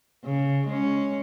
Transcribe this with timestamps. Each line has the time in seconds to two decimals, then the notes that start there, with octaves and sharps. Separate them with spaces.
0.25 C#3
0.67 G#3 C#4